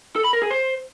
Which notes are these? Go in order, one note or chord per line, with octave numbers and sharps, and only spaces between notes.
A4
B5
A#4
G#4
C5